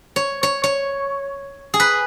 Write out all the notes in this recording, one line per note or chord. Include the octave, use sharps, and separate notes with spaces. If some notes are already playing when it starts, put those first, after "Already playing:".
C#5
C#5
C#5
G#4
B4